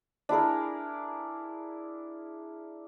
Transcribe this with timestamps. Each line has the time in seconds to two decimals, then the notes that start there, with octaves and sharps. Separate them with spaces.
0.29 D4 E4 G#4 A#4